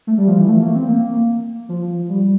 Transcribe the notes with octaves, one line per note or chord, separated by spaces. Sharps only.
A3
G3
F3
E3
A3
A#3
C4
A#3
F3
G3